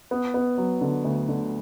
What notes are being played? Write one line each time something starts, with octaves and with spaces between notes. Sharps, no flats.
B3
B3
F#3
D3
D2
D3